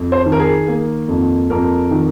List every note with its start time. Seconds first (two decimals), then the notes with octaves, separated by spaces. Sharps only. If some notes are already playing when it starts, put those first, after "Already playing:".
Already playing: F2
0.12 C5
0.26 D#3
0.32 A#4
0.40 G#4
0.67 A#3
1.08 F2
1.50 F2 A#4
1.91 D#3